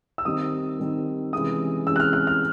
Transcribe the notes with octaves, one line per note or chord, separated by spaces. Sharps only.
E6
D#3 G3 C4 D#4 D#6
D#3 G3 C4 D#4
C3 E3 G#3 C#4 D#6
C3 E3 G#3 C#4 E6
F#6
F6
F#6
F6